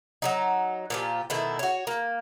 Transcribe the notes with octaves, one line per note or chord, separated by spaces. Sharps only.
F#3 G3 D#4
A#2 F3 G4
B2 D#3 A3 E4
F#4 C#5
A#3